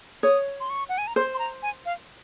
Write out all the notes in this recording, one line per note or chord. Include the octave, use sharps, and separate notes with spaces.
C#5 D#6
C6
C#6
F#5
G#5
A#5
C5 C6
C6
A#5
G#5
F5